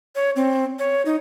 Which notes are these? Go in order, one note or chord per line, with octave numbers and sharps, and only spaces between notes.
C#5
C4
C#5
D#4